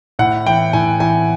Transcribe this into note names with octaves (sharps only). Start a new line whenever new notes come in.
A2 F#5
E3 G5
A2 G#5
E3 G#5